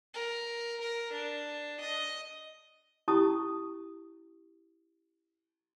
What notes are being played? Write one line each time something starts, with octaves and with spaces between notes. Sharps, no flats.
A#4
A#4
D4
D#5
C#4 E4 G4 A5 C#6 D#6